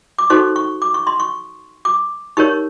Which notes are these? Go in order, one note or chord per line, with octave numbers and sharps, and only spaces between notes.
D6
D#4 F#4 A4 C5 C#6
C#6
D6
C#6
C6
C#6
D6
D#4 G4 A#4 C#5 C#6